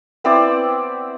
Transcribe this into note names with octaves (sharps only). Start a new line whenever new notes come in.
B3 C4 E4 D5